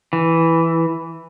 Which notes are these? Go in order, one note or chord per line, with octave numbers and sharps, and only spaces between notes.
E3